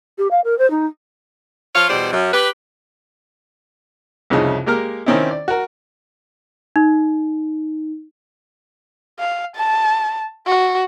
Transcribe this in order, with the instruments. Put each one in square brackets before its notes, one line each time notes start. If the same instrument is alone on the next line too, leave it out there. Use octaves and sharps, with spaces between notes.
[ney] G4
F5
A#4
C5
D#4
[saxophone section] F3 F4 C#5 F5
E2 B2 G3 C5 D5
F#2
G4 B4
[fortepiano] C2 F2 C#3 C#4 D#4 E4
G#3 A#3 G4 A#4 F6
D#3 C4 C#4 D#4 E4
D5
F#4 A#4
[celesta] D#4
[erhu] F5
A5
F#4